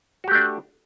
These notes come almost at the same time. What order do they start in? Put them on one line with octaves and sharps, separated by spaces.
F#4 G4 A3 D4